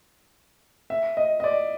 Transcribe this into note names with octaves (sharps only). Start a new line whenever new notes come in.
E5
D#5
D#5
D5